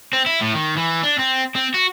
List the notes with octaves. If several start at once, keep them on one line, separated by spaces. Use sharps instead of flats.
C4
E4
A2
D#3
E3
D4
C4
C4
F#4